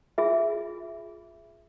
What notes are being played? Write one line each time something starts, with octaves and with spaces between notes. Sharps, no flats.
F4 G#4 E5